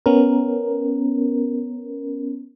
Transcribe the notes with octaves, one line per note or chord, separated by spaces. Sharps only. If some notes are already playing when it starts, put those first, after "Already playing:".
B3 C#4 A#4